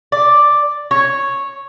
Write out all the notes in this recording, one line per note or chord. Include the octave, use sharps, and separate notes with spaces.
D5
C#5